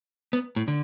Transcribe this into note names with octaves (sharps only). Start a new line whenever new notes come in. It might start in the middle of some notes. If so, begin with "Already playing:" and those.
B3
A2
D3